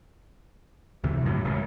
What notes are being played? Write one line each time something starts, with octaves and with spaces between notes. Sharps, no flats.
D2 C3 E3
F#2 A2 C#3 E3
F#1 C#2